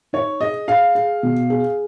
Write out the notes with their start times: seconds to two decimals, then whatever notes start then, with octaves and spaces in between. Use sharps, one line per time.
0.13 D#4 C#5
0.40 G#4 D#5
0.68 G#4 F5
0.95 G#4
1.23 B2
1.50 G#4